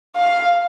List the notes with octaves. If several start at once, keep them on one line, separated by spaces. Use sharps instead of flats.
F5